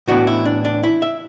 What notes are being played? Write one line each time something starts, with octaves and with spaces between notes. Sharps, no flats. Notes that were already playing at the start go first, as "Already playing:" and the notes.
A2 E3 B3 D4 F#4
E4
D4
D4
E4
E5